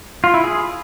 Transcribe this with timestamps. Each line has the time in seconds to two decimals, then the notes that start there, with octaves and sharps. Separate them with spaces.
0.24 F4
0.34 E4
0.44 G#4